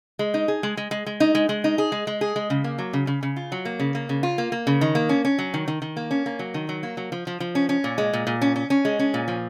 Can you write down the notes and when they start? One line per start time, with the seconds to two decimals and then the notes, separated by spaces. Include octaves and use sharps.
0.19 G#3
0.34 D#4
0.48 G#4
0.63 G#3
0.77 G#3
0.91 G#3
1.06 G#3
1.20 D#4
1.35 G#3
1.49 G#3
1.64 D#4
1.78 G#4
1.92 G#3
2.07 G#3
2.21 G#4
2.36 G#3
2.50 C#3
2.64 A#3
2.78 F#3
2.93 C#3
3.07 C#3
3.23 C#3
3.36 F4
3.52 F#3
3.65 A#3
3.80 C#3
3.95 A#3
4.09 C#3
4.23 F4
4.38 A#3
4.52 A#3
4.67 C#3
4.81 D#3
4.95 A#3
5.09 C#4
5.25 C#4
5.39 F#3
5.54 D#3
5.68 D#3
5.82 D#3
5.97 A#3
6.11 C#4
6.26 A#3
6.39 F#3
6.54 D#3
6.69 F#3
6.83 A#3
6.97 F#3
7.12 F3
7.27 F3
7.40 F3
7.55 C#4
7.69 C#4
7.84 A#2
7.98 G#3
8.13 A#2
8.27 A#2
8.41 C#4
8.56 C#4
8.70 C#4
8.85 G#3
8.99 C#4
9.14 A#2
9.28 F3